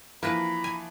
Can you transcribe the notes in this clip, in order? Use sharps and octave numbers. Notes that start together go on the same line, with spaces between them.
E3 F3 A#3 D4 B4 A#5 B5
G#5